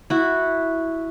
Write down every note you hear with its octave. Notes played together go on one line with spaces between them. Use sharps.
E4 F#4